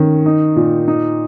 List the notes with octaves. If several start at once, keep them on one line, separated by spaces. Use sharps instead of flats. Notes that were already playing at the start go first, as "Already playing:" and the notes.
Already playing: D#3 C#4
D#4
A#2
D#4